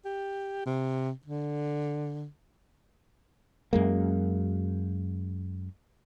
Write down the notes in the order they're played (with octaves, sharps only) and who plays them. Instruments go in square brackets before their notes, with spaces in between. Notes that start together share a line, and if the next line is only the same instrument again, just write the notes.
[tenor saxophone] G4
C3
D3
[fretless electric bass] F#2 G#3 A#3